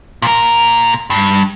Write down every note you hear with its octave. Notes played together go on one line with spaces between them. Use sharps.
A#2 A#4
G2